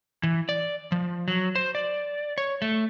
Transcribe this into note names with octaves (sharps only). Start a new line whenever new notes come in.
E3
D5
F3
F#3
C5
D5
C#5
A3